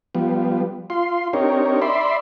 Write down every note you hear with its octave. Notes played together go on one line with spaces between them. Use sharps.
F3 G3 B3
F4 C6
C4 D4 D#4 G4 A#4 C#5
D5 E5 B5 C6